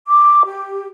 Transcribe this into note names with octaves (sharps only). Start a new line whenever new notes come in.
D6
G4